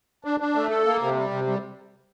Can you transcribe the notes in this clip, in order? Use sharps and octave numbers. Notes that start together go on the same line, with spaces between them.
D4
D4
A3
A4
A#3
C3
G3
C3
G3